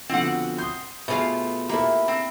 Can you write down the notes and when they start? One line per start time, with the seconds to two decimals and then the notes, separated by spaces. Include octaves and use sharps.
0.09 B2 D3 F3 C4 F#5
0.58 C6 D#6 G6
1.08 B2 A3 F4 G#4 F5
1.69 A#3 E4 G4 A4 A#4
2.08 C4